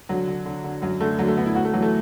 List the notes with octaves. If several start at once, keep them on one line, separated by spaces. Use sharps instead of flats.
D3 F#3
D3
D3
D3
F#2 F#3
D3 A3
D3 F#3
A3
D3 B3
E4
A2 F#4
A3
E3 F#3
A3